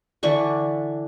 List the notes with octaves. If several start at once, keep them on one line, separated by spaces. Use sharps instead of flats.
D3 E3 D4 C#6